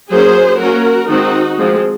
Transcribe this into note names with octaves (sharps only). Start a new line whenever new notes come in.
F#3 A#3 C#4 G#4 C5
F#3 A#3 C#4 F#4 A#4
D#3 G#3 C4 D#4 F#4
F3 G#3 C4